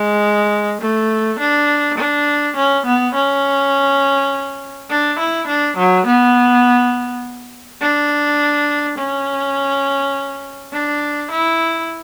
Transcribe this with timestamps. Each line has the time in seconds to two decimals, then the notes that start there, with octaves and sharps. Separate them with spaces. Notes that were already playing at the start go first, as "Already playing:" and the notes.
Already playing: G#3
0.81 A3
1.39 D4
1.98 D4
2.56 C#4
2.86 B3
3.15 C#4
4.90 D4
5.19 E4
5.47 D4
5.77 F#3
6.06 B3
7.81 D4
8.98 C#4
10.73 D4
11.31 E4